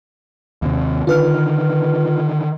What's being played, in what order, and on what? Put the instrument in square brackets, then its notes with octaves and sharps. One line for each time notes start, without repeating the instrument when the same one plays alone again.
[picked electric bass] D#2 C3
[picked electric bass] D3 D#3 [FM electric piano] F4 B4 F6